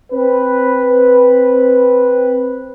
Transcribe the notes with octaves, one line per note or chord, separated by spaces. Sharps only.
C4 B4